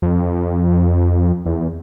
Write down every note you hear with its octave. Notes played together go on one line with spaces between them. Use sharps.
F2
E2